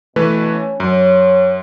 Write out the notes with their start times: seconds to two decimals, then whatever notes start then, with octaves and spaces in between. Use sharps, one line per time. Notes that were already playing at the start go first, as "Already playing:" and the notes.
0.16 B2 E3 A3 B4
0.51 C#4
0.80 F#2 C#5